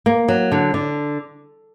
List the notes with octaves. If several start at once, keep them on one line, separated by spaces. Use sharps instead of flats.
A#3
F#3
D3
D3